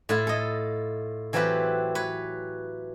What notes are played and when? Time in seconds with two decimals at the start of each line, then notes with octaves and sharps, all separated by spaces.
0.09 A2 E4 F4
0.27 A4 D#5
1.33 E3 F#3 C4 F4 G4 B4
1.95 B4 C#5